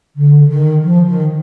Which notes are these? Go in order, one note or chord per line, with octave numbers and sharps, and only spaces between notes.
D3
D#3
F3
D#3